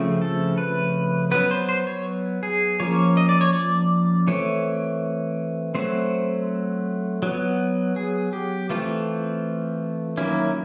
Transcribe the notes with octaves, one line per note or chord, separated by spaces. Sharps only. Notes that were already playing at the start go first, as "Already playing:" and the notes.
Already playing: C#3 F3 A3 C4
A4
B4
F#3 B3 B4
C5
C5
C#5
G#4
F3 A#3 C#4 C#5
D#5
D5
C#5
D5
E3 A3 C4 C#5
F#3 A3 C4 C5
F#3 B3
G#4
G4
E3 A3 C4 F4
D#3 F#3 A#3 C#4 E4